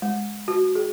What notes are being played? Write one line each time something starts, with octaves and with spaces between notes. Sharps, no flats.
G#3
F#4
G#4